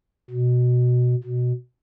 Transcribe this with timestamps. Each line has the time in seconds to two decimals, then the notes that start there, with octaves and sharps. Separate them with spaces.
0.30 B2
1.24 B2